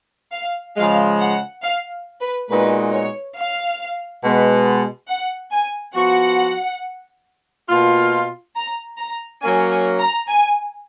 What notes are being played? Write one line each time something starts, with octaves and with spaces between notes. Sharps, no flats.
F5
C#3 F3 G#3 F5
F#5
F5
B4
A#2 G#3 B3 D#4 F#4 B4
C#5
F5
B2 G#3 B3
F#5
G#5
F3 B3 F#4 F#5
B2 A#3 F4
A#5
A#5
F#3 A#3 C#4 G#5
G#5
A#5
G#5